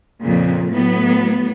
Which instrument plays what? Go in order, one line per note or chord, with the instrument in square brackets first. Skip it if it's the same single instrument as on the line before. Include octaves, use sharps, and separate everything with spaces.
[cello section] F2 A#2 C#3
A2 F#3 B3